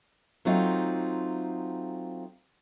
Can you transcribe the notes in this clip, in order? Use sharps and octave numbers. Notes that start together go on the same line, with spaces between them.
F#3 A3 C4 D#4 F4